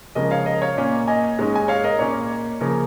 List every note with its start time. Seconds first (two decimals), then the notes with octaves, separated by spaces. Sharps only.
0.15 C#3 F3 G#3 C#4 A#4 D#5
0.31 C#5 F5
0.46 A#4 D#5
0.62 C#5 F5
0.77 A#2 A#3 C#4
1.08 D#5 G#5
1.38 G#2 G#3 C#4
1.55 G#5
1.68 C#5 F5
1.84 A#4 D#5
1.99 A#2 A#3 C#4 C#5
2.61 C#3 F3 A#3 C#4 A#4